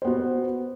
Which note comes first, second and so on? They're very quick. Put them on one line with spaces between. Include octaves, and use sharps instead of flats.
C5 B3 F#4